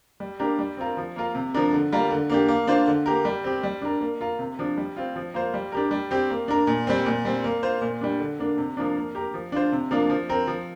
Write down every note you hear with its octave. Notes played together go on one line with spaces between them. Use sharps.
G3
A#3 D4 G4 A#4
G3
C4 F4 A#4
F3
A#3 F4 A#4
C3
F3 D4 A#4
D3
G3 A#3 F4 A#4
D3
A#3 D4 G4
A#3
D4 F4 C5
D3
A#3 G4 A#4
G3
C4 G4
G3
D4 A#4
A#3
F4 A#4
C3
F3 D4
G3
C4 F4
F3
A#3 F4 C5
G3
D4 G4 A#4
G3
C4 G4
A#3
D4 A#4
A#2
G3 C4
A#2
G3 C4
A#3
F4 C5
A#2
G3 D4
D3
A#3 D4
C3
F3 A#3 D4
A#3
G4 A#4
F3
D4 F4 C5
C3
F3 A#3 D4 F4
F3
C4 A#4
F3